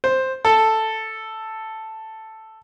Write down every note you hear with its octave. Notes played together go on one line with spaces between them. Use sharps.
C5
A4